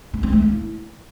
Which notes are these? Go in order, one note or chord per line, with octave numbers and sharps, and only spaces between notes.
B3
C4
A3
A#3
E4